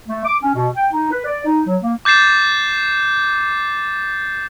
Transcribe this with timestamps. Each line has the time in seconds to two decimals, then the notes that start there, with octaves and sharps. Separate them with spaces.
0.08 A3
0.25 D6
0.43 C#4
0.55 B2
0.77 G5
0.93 D#4
1.11 B4
1.25 D5
1.45 D#4
1.67 F#3
1.83 A#3
2.05 D6 G6 A6 C7 E7